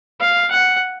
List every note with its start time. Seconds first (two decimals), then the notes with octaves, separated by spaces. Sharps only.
0.20 F5
0.50 F#5